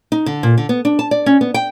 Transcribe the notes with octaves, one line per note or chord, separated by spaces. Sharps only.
D#4
D3
A#2
D3
B3
D4
A5
D5
C#4
B3
G5